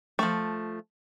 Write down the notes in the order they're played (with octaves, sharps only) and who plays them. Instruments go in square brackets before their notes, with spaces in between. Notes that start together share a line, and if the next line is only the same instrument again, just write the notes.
[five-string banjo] F3 A3